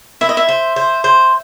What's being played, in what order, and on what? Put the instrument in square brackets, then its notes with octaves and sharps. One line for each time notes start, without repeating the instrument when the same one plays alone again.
[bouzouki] E4 [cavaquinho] E5
[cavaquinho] D#5
E5
[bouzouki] C5
C5
C5